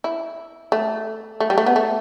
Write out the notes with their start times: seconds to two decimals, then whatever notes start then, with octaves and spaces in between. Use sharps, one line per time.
0.04 E4
0.72 A3
1.40 A3
1.50 G3
1.58 A3
1.66 B3
1.76 A3